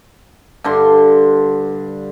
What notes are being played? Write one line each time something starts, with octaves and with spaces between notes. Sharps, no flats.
G2 D3 C6